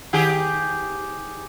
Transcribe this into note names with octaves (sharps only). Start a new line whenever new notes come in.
D#3 G4 G#4